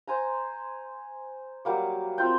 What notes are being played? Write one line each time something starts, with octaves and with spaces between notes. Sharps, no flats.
C5 G#5 A#5
F#3 G3 A#3 D6
C4 F4 G5